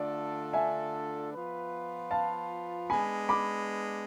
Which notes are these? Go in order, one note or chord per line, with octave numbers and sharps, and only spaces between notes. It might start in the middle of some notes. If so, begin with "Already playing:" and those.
Already playing: D3 A3 D4 F4 A4 D5
E5 G#5
F3 B3 F4 B4
F5 A5
G#3 B3 D4 G#5 B5
B5 D6